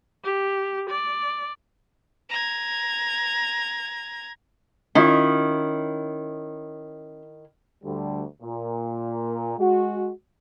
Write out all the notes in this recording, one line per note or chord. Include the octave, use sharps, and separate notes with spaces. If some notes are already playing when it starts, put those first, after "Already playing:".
G4
D5
A#5 G#6
D#3 C#4 E4 F4
D2 D3 G3
A#2
G#3 F#4